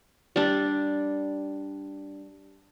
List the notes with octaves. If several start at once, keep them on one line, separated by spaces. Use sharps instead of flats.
G3 D4